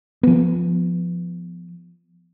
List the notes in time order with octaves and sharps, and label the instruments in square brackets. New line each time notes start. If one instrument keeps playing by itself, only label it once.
[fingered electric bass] F3 B3